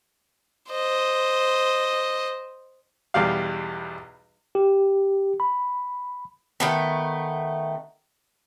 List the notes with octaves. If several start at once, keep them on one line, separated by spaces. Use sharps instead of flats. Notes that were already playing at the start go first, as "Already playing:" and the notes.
C5 D#5
B1 E2 G3 F5
G4
B5
D#3 A3 B3